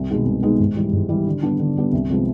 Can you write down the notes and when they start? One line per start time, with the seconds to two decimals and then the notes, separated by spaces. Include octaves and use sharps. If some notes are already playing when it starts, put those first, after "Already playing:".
Already playing: C2
0.09 B2 G#3 B3 D#4
0.25 C2
0.43 B2 G#3 B3 D#4
0.60 G#2
0.76 E3 G3
0.93 G#2
1.09 E3 G3
1.27 D3
1.42 G3 B3 D4
1.60 D3
1.77 G3 B3 D4
1.93 C2
2.10 C3 F3 G#3 B3